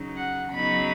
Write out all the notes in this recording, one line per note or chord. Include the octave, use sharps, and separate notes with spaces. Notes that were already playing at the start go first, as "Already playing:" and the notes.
Already playing: C#3 F#3 D#4
F#5
C#3 F#3 B3 D#4 B5